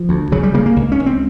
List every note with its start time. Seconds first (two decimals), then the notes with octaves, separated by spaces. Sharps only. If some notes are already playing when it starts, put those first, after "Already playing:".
Already playing: F3
0.09 D2
0.32 C#3 F#3
0.43 G3
0.54 C#3 A#3
0.66 A#3
0.76 C#2
0.92 C#4
1.00 C#2
1.06 C4